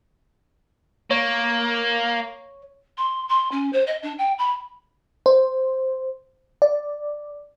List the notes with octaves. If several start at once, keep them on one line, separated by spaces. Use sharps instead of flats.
A#3 C#5
C6
C6
C#4
C5
D#5
D4
G5
B5
C5
D5